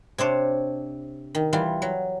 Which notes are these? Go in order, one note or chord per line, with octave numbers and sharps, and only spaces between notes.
C3 D4 C5 C#5
D#3
E3 G3 F4
F#3